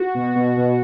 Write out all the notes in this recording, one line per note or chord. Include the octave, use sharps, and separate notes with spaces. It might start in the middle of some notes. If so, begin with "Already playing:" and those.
Already playing: F#4
B2
B2
B2